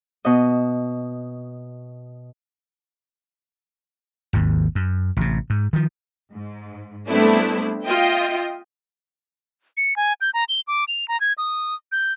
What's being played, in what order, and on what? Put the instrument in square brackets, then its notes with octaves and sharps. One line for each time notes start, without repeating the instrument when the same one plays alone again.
[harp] B2 D#5
[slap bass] G#1 D#2 G#2
F#2
A1 C3
G#2
D#3 F3
[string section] G#2
G3 A3 B3 C4 D4 E4
F4 D#5 E5 G5
[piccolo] C#7
G#5
G6
A#5
G7
D6
F7
A#5
G#6
D#6
G6